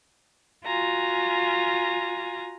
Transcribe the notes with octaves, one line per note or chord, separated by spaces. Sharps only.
F4 F#4 G#5 A#5